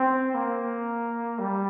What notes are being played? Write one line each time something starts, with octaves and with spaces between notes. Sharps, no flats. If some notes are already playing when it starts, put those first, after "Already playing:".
Already playing: C4
A#3
G3